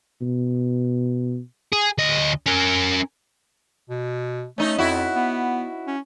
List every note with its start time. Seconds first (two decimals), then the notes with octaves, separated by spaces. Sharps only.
0.21 B2
1.72 G#4
1.98 D2 D#5
2.46 C#4 A#4
3.90 B2
4.58 A3 C#4 D#4
4.78 F2 E4 F#4
5.15 B3
5.87 C#4